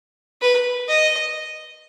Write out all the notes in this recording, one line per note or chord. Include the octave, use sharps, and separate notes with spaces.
B4
D#5